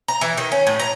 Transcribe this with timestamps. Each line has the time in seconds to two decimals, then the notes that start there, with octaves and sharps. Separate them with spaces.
0.08 A#5
0.21 E3
0.38 D#3
0.52 C#4
0.67 A2
0.80 A#5